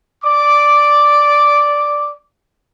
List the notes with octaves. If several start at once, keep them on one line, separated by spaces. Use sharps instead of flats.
D5 D6